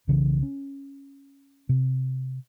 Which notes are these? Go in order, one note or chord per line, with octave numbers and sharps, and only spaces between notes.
B1 C#3 E3
C#4
C3